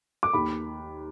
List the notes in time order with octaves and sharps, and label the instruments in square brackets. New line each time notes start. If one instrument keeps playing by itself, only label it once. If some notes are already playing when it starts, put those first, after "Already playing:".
[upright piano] D6
[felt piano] D#2 [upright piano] B5